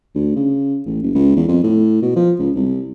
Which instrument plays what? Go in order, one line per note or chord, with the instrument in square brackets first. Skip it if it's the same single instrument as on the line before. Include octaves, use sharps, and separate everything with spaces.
[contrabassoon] D2
C#3
A1
F#1
C#2
E2
F2
A2
B2
F3
C#2
C2